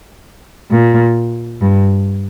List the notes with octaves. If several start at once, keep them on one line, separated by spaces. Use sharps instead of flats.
A#2
G2